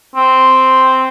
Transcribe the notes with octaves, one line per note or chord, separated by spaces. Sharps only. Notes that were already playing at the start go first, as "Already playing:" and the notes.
C4